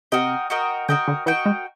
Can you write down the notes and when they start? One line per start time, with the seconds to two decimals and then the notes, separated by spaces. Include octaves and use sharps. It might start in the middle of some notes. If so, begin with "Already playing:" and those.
0.12 C3 F#4 A#4 D#5 G5
0.50 F#4 A#4 D#5 G5
0.88 D3 F#4 A#4 D#5 G5
1.08 D3
1.26 E3 F#4 A#4 D#5 G5
1.46 G#3